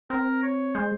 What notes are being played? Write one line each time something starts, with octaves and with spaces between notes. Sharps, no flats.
C4 A#4
C#5
G#3 C5